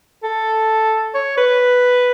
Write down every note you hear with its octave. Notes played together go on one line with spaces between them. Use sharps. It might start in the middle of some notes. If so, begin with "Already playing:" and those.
A4
C#5
B4